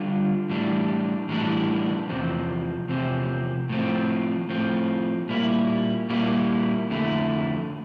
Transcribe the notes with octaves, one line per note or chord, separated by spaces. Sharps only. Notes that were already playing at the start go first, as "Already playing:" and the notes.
Already playing: D3 G3 D4 F4
A2 E3 G3 D4
A2 E3 G3 D4
E2 C3 F3 C4
E2 C3 F3 C4
A2 F3 C4
A2 F3 C4
A#2 G3 A#3 E4
A#2 G3 A#3 E4
F2 D3 A3 E4